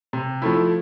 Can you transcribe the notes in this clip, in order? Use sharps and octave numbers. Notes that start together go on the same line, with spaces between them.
C3
F3 A3 E4